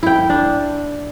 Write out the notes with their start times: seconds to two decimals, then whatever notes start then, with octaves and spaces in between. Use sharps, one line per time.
0.03 E4 G5
0.30 D4